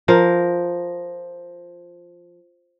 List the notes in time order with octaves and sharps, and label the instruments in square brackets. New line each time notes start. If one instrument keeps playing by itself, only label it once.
[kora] F3 A#4